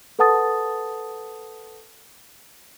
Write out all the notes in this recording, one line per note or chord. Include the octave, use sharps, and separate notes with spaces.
A4 B4 F#5 A5 D#6 A6